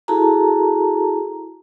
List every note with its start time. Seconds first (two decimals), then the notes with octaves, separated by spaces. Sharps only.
0.08 E4 F#4 G#4 A4 A5 A#5